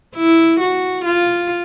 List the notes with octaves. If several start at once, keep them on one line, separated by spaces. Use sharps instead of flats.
E4
F#4
F4